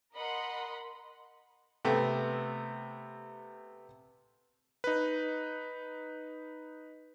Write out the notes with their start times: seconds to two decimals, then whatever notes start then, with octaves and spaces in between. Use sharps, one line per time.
0.14 A#4 D#5 F#5 B5 C6
1.85 C3 A3 B3
4.84 D#4 B4